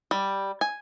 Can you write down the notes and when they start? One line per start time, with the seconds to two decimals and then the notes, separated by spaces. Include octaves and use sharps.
0.11 G3
0.61 G#5